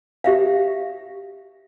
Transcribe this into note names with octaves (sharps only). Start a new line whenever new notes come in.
G4 E5 F5